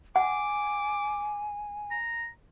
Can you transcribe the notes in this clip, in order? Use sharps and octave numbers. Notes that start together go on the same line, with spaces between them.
F#5 G#5 D6
A#5